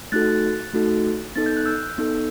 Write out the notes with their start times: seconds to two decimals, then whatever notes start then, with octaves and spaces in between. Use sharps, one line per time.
0.12 A3 D#4 F#4 A4 F#6 A6
0.74 A3 D#4 F#4 A4
1.36 B3 D#4 A4 A6
1.46 G6
1.57 F#6
1.66 E6 G6
1.98 B3 D#4 A4